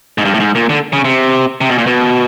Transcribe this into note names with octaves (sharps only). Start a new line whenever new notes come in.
G#2
G2
A2
G#2
A#2
D3
C#3
C3
C3
B2
A#2
B2